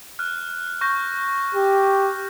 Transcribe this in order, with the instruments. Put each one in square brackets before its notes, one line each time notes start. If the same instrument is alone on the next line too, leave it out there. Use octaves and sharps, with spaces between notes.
[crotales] F6 F#6
C#6 G6 A#6
[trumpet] G4